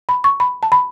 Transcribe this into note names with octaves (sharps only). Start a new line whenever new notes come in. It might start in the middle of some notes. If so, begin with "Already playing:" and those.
B5
C#6
B5
A5
B5